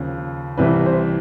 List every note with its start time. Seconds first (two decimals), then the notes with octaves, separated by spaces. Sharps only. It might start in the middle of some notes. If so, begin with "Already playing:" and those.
Already playing: D#2 C#3 F3
0.57 C2 C3 E3 B4
0.86 C5